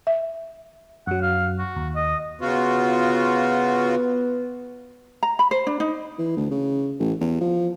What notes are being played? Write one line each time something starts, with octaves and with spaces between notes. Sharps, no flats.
E5
F#2 F#3 F#5
F5
F#4
D#2
D#5
C#3 B3 F4 F#4
A#5
B5
C5
D4
D#4
E3
D2
C#3
A1
E2
F3